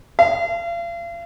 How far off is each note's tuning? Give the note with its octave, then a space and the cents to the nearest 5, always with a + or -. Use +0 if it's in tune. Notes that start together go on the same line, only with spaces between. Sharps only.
F5 -40